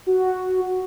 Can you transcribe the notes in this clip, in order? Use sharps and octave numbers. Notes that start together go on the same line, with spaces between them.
F#4